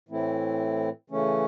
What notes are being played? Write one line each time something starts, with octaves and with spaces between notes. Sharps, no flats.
A2 E3 A3 C4 E4
C#3 E3 A3 C#4